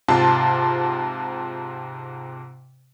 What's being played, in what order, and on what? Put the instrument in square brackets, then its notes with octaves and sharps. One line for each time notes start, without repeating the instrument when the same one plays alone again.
[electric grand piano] G#2 C3 F4 A5 C6